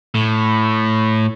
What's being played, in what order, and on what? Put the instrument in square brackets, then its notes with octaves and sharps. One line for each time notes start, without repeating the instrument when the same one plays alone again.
[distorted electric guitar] A2